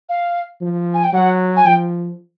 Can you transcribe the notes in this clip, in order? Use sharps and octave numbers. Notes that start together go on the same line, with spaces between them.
F5
F3
G#5
G5
F#3 F#5
G#5
F3 G5